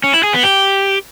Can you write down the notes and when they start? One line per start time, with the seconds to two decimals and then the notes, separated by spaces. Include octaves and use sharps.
0.04 C#4
0.14 E4
0.23 G#4
0.33 B3
0.43 G4